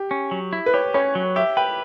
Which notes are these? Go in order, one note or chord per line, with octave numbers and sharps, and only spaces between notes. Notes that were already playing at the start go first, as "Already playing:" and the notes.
Already playing: G4
C#4
F#3
E4
B4
G4 C#5
C#4 C#5
F#3
G4 E5
B4 G5